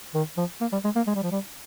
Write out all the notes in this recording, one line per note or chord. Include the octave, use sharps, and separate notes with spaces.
D#3
F3
A#3
G3
G#3
A#3
G#3
G3
F3
G3